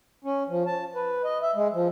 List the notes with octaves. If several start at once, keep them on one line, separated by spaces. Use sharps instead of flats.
C#4
F3
A5
B4
D#5
E5
G#3
F3